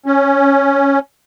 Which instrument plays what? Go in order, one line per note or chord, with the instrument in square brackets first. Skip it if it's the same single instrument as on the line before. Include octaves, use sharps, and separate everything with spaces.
[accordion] C#4